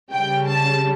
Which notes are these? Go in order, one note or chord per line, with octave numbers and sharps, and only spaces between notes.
C#3 G3 G5
A5